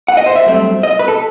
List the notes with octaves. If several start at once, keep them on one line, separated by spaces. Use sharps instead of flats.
F#5
D#5
C5
E5
G2 F#3 A3 C4
D#5
B4
A4